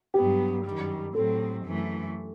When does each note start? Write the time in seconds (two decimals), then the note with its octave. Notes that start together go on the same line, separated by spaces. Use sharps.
0.14 G2 F#3 B3 G4
0.65 F#2 D#3 G3
1.15 A2 F#3 C4 A4
1.65 F#2 E3 A3